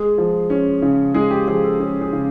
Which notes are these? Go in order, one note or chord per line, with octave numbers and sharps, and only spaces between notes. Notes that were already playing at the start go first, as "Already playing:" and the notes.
Already playing: G#3 G#4
F3
C#4
C#3
G#3 G#4
G4
F3 G#4
A4
C#4 G#4
G#4
C#3